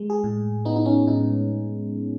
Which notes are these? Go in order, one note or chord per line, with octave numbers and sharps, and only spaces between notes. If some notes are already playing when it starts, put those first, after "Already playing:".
Already playing: G#3
G#4
A2
B3 D#4
D#4
C#4
A2 D#4